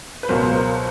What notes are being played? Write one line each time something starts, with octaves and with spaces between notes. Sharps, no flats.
B4
C#2 B2 F#3 A#4 C5
A#4 C5